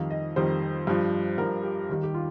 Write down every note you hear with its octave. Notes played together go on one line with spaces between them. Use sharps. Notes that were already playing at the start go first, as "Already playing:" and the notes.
Already playing: F2 D#3 G3 F5
D#5
F2 D#3 G3 C5
G2 F3
G2 F3 A#4
G4
D#2 D#3 G3
G4
F4